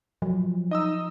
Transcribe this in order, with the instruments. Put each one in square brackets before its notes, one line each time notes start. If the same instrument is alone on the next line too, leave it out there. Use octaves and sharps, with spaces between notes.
[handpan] F3 [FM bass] F#3
[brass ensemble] D#4 [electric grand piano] D#5 D#6 E6